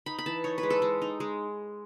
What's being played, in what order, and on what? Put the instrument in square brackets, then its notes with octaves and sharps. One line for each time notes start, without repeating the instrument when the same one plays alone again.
[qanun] D#4 B5
B5
E3 A5
D#4 C#5
B4
G#3
A4
G#3
D#4
G#3